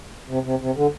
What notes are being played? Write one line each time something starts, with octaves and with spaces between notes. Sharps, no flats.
C3
C3
C3
D3